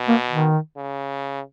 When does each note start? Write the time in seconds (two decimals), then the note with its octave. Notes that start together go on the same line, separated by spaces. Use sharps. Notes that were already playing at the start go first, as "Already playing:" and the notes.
Already playing: B2
0.08 A#3
0.30 D#3
0.77 C#3